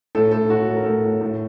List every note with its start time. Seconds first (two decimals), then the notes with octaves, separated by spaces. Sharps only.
0.15 A2 A4
0.31 A2 A4
0.49 A2 F#4
0.68 A2 A4
0.76 A#4
0.84 A2 A4
1.04 A2
1.21 A2